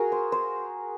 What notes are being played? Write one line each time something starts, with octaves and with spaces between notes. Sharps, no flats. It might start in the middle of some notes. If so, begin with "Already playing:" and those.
Already playing: F#4 G#4 A#4
C5
C5